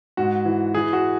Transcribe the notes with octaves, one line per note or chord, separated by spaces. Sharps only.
G#2 F#4
E3
E3 G#4
F#4